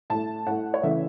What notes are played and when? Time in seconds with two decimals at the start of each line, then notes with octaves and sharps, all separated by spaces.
0.10 A2 A3 A5
0.47 A2 A3 F#5
0.74 C#5
0.83 C#3 E3 A3 E5